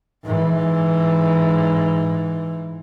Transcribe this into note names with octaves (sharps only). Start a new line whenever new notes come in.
G#2 E3